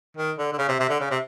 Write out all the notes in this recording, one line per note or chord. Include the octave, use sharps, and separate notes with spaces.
D#3
D3
D3
C#3
C3
C3
D3
C#3
C3